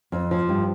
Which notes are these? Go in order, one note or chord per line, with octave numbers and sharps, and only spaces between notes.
F2
F3
G2